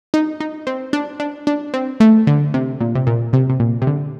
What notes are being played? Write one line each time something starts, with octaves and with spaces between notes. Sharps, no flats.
D#4
D#4
C4
D4
D4
D4
C4
A3
D3
C3
A#2
C3
A#2
C3
C3
A#2
C3
D3